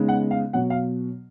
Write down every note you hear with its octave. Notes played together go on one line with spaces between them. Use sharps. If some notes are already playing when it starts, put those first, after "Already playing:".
Already playing: C#3 G#3 B3 D#4
F#5
F5
B2 F#3 B3 F#5
F5